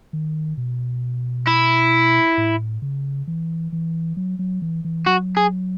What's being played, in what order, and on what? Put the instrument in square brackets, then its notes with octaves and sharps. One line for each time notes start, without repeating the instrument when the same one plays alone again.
[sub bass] D#3
B2
[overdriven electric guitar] E4
[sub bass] A2
C#3
E3
E3
F#3
F#3
E3
E3
[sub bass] F#3 [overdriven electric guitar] F#4
[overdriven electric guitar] G#4